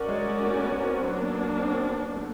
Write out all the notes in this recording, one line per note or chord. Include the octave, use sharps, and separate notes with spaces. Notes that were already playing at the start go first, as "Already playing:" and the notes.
Already playing: C#4 F#4 A#4 D5
G#3
G#3
A3
B3
C4
F#3 A#3 B3 D4
B3
B3
C4
B3
A3